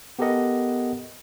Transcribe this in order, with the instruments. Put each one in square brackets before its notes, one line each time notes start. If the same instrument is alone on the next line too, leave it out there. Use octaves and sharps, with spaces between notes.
[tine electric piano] B3 G4 A4 A#4 D#5 F#5